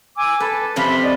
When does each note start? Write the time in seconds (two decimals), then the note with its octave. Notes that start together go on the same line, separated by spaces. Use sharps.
0.18 G#5 D6 E6
0.40 A4 B4
0.76 F2 C3 E5 F5 B5 C6
1.03 D5 D#5